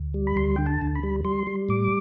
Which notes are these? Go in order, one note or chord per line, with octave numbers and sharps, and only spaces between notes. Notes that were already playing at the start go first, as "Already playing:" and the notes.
Already playing: D2
G3
B5
D2 C6
D3 G5
A5
D2
B5
G3
G3 C6
G3
A2 D6